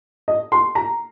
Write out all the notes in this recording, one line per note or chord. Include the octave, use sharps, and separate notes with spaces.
D#5
C6
A#5